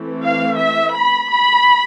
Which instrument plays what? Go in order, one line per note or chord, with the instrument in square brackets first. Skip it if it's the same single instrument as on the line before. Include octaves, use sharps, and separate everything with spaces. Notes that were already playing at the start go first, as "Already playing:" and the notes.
Already playing: [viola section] E3 A3 C4
F5
E5
B5
B5